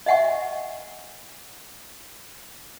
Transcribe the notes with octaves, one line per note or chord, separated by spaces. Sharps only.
D#5 E5 F#5 G#5 C#6